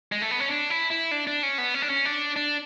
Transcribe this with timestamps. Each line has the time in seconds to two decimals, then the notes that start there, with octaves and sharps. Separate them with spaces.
0.12 G#3
0.22 A3
0.31 B3
0.40 C#4
0.48 D4
0.70 E4
0.90 E4
1.11 D4
1.27 D4
1.43 C#4
1.58 B3
1.74 C#4
1.82 D4
1.90 C#4
2.05 D4
2.36 D4